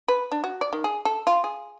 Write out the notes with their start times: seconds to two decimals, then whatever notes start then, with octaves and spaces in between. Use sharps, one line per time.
0.08 B4
0.32 D4
0.44 F#4
0.61 D5
0.73 D#3
0.84 G#4
1.05 A4
1.27 F4
1.44 G#4